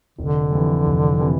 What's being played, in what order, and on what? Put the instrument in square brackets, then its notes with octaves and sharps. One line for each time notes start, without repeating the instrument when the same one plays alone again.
[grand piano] F1 [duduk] D3
[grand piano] F2 C3 E3
F1
C3 E3